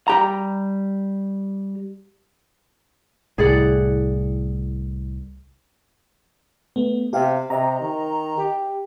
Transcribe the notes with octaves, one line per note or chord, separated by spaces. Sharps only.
G3 G4 A#5
C2 A2 G#4 D5 F#5
A3 B3
C3 G4 F5 G5
C3 D#5 A#5
D#3
G4